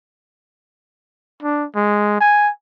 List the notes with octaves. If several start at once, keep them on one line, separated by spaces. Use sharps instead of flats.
D4
G#3
G#5